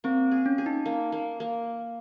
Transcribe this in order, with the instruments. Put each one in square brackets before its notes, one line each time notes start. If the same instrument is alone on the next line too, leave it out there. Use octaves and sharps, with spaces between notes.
[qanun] A#3 [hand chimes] C4
[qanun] G#4
[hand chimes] C#4
[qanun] G#4
[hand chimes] D#4
[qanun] A#3
A#3
A#3